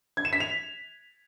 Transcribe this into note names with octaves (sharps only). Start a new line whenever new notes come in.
G#6
E7
B6
F7